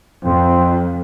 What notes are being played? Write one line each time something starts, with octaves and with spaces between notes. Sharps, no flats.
F2 C4